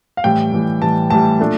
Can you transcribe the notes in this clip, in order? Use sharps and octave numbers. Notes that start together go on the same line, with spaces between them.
F5
A2 E3 G3 G5
A2 E3 G3
A2 E3 G3 A5
A2 E3 G3 A5
A#2 A3 D4